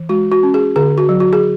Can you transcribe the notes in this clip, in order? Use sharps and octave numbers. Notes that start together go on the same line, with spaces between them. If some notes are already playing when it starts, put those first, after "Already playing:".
Already playing: E3
G#3 F#4
F#4
C#4
G#4
D3 G#4
F#4
F#3
F#4
G#4